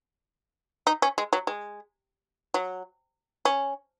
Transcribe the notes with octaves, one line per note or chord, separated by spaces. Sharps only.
D#4
C#4
G#3
F#3
G#3
F#3
C#4